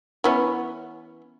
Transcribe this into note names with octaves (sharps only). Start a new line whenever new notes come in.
E3 B3 C#4